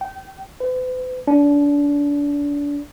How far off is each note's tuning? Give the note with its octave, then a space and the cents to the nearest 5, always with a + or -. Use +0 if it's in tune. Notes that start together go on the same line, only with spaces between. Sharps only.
G5 -25
B4 +45
D4 -30